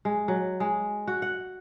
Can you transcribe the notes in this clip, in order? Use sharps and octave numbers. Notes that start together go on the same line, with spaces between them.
G#3
F#3
G#3
F#4
F#5